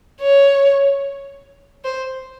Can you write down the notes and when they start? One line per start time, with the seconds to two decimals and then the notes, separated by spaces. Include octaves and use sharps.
0.21 C#5
1.84 C5